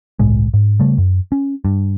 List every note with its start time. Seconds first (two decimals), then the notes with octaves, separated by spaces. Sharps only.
0.19 G1 C2 A2 G#3
0.54 G#2
0.80 C#3 G3 A3
0.98 F#2
1.32 C#4
1.65 G2